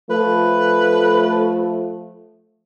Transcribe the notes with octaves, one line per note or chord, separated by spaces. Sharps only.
F3 A3 B4